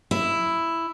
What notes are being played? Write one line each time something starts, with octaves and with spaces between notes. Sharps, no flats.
E4